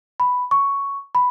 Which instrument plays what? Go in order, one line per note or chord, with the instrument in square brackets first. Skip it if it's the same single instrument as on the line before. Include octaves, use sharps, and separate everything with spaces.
[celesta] B5
C#6
B5